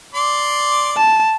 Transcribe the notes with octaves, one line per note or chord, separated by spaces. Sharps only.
D5 C6 D6
A5